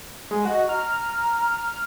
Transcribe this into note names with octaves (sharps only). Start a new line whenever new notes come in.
G#3
F#4 D#5
A#5 F6